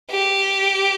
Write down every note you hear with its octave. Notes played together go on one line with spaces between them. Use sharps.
G4